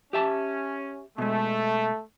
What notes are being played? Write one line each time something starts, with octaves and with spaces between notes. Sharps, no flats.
C#4 G4 E5 A5
B2 G#3 A3